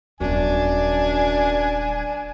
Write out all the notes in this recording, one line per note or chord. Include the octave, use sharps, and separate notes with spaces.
D#1 F#2 B3 D4 G#5